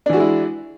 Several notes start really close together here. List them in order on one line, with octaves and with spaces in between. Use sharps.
D4 E3 F#4 G#3 E4